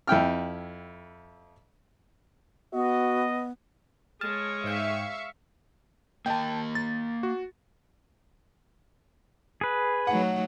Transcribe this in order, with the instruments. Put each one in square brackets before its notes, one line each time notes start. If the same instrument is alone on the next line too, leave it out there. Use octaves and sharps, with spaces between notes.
[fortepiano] F2 E4 G5 F6
[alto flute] B3 [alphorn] F#4 [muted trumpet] D#5
[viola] G#3 C#5 [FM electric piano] A5 [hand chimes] F6
[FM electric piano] G#2 G5 [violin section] E5 F5 C#6
[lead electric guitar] A#3 D#5 [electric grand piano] G5 A5
[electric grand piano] A6
F#4
[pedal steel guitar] G#4 B4
[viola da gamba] F#3 A3 D#4 [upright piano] F#5